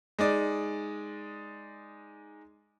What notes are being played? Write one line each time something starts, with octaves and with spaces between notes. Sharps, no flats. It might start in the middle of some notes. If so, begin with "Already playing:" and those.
G#3 D#4 D5